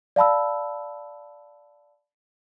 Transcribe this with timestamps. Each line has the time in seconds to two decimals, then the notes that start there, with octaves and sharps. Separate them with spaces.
0.16 D5 F5 A5 B5 E6